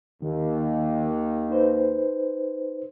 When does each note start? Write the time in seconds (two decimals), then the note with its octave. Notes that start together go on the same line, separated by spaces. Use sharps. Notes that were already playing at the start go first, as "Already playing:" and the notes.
0.22 D#2 D#3
1.50 D#4 B4 C5